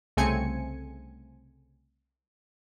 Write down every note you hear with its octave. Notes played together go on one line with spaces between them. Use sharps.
C2 C#3 A3 C4 G#5 C#7